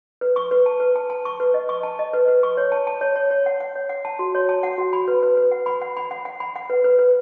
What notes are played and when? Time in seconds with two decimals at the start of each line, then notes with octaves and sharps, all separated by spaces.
0.21 B4
0.36 C#6
0.51 B4
0.66 A5
0.80 B4
0.96 A5
1.10 A5
1.25 C#6
1.40 B4
1.54 D#5
1.69 C#6
1.83 A5
1.99 D#5
2.13 B4
2.28 B4
2.43 C#6
2.57 C#5
2.72 A5
2.87 A5
3.01 C#5
3.16 C#5
3.31 C#5
3.46 F#5
3.60 F#5
3.76 C#5
3.89 F#5
4.05 A5
4.19 F#4
4.35 C#5
4.49 A5
4.63 F#5
4.78 F#4
4.93 B5
5.08 B4
5.23 B4
5.37 B4
5.51 F#5
5.66 B5
5.82 F#5
5.97 B5
6.11 F#5
6.25 F#5
6.40 B5
6.56 F#5
6.70 B4
6.84 B4
6.99 B4